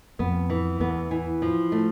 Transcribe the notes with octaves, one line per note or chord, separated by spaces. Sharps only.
F2 B3
E3
E2 B3
E3
F3
A3